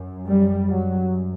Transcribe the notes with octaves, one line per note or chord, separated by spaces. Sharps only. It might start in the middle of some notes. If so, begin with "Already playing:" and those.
Already playing: F#2
G3
F#2 F#3